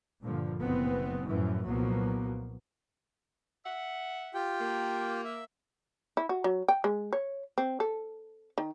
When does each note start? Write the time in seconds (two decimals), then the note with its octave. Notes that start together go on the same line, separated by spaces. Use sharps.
0.21 G2 A#2 D3 F3
0.61 F#1 B2 B3 C4
1.28 F#2 A2 E3 F3
1.65 C2 A#2 F3 F#3 A#3 B3
3.65 E5 F#5
4.34 F4 G4 G5
4.60 A#3
5.24 E5
6.17 E4
6.29 F#4
6.44 F#3
6.68 G5
6.84 G#3
7.13 C#5
7.58 C4
7.80 A4
8.58 D#3